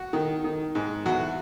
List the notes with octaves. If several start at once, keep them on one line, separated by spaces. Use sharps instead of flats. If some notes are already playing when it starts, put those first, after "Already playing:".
Already playing: F#4
D#3
D#3
G#2
E2 F#4